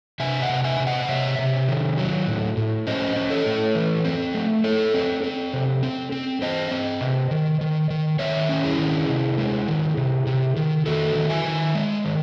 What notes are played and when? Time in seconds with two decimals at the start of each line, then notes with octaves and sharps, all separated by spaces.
0.20 C3 E5 G#5
0.42 D#5 F#5
0.49 C3
0.64 E5 G#5
0.80 C3
0.87 D#5 F#5
1.09 C3 C#5 E5
1.39 C3
1.68 D#3
1.98 F#3
2.27 A2
2.57 A2
2.87 C#4 C5 D#5
3.16 C#4
3.30 A4 C#5
3.46 A2
3.75 E3
4.05 C4
4.35 A3
4.64 A3 A4 C#5
4.94 C4
5.24 C4
5.53 C3
5.83 C4
6.12 C4
6.42 C4 C5 D#5
6.71 C4
7.01 C3
7.31 D#3
7.61 D#3
7.90 D#3
8.19 D#3 C#5 E5
8.49 C#4
8.64 E4 G#4
8.79 D#3
9.08 C3
9.38 G#3
9.68 D#3
9.97 C3
10.27 C3
10.56 D#3
10.86 D#3 F#4 A4
11.15 D#3
11.30 E5 G#5
11.45 D#3
11.75 G#3
12.04 D#3